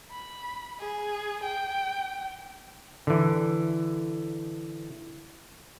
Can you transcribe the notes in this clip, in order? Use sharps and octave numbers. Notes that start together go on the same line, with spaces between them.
B5
G#4
G5
D3 E3